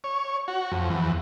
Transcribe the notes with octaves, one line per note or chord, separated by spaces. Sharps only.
C#5
F#4
F2
E2